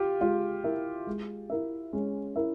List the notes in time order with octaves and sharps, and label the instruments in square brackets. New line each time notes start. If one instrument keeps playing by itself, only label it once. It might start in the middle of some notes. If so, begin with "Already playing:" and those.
Already playing: [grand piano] F4 G4
[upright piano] G#3 [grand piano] F4
[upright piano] E4 A#4 E5
G#3
E4 A#4 E5
[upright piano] G#3 [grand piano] C#4
[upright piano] E4 A#4 E5